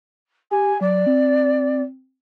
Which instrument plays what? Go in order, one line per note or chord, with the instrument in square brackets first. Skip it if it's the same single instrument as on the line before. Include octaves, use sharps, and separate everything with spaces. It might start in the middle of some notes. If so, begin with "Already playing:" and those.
[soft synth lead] G4 [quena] G#5
[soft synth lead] F#3 [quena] D5
[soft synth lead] C4